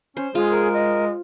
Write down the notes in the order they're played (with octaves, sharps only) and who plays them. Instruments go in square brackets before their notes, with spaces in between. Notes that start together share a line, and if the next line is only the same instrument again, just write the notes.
[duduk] C#4 [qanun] C5
[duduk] G#3 [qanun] F4 [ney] G#4
[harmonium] A#4
[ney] D#5